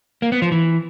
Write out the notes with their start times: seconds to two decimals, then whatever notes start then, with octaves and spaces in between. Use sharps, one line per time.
0.22 A#3
0.32 B3
0.42 F3
0.52 E3